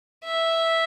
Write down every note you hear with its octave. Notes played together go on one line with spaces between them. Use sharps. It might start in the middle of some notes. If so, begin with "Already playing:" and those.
E5